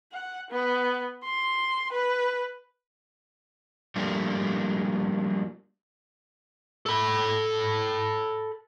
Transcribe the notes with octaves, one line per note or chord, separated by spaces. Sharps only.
F#5
B3
C6
B4
F3 G3 A3 A#3 D4
A4 B5